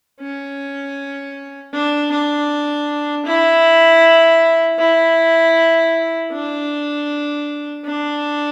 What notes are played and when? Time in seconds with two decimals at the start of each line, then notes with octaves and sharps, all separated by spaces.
0.20 C#4
1.73 D4
2.11 D4
3.26 E4
4.79 E4
6.32 D4
7.85 D4